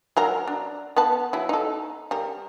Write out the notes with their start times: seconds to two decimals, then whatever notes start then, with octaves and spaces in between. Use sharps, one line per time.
0.17 F#3 A#4 A#5
0.48 D4
0.96 B3 B4 A5
1.33 F#3 E4
1.49 D#4 A4
2.11 G3 A#4